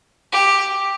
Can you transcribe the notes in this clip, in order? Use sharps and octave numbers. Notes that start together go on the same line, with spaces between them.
G4